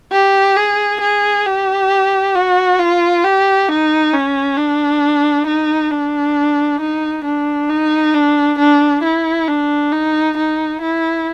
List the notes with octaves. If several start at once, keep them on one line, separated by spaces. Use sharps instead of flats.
G4
G#4
G#4
G4
F#4
F4
G4
D#4
C#4
D4
D#4
D4
D#4
D4
D#4
D4
D4
E4
D4
D#4
D#4
E4